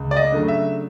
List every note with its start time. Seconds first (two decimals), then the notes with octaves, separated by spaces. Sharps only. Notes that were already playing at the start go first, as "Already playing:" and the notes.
Already playing: C#2
0.11 D5
0.17 D#5
0.32 C#3 F#3 A3 D4
0.48 E5